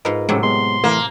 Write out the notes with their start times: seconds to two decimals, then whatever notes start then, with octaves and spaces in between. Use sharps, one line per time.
0.05 G#2 F4 A#4 B4 D#5
0.29 A2 C3 F#3 G#3 C#4
0.43 G#3 B3 C6
0.84 E3 A3 A#3 A5